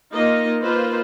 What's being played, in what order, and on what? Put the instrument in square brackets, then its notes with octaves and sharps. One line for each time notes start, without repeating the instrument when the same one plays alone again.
[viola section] A#3 D#4 F4 D#5
A#3 D#4 F4 B4 C5